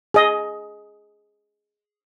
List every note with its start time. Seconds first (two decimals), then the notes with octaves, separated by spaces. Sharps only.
0.14 G#4 D#5